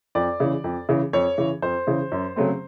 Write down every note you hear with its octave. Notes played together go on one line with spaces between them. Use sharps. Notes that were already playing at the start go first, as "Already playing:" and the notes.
F2 D5
C#3 E3
F2
C#3 E3
F2 C#5
C#3 E3
F2 C5
C#3 E3
F#2
C#3 F#3 A3 C4